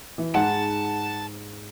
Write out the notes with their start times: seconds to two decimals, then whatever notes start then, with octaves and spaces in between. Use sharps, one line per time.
0.18 E3
0.35 G#2 F#5 A5